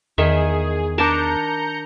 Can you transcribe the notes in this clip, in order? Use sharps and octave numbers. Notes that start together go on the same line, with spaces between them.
E2 D#3 G#4 E5
D4 A#4 A5 A#5 G6 C#7